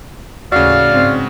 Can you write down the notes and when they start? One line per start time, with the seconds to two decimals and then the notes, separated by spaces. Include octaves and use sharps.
0.52 D#2 A2 C#3 F#4 D5 F5
0.90 G#2 C4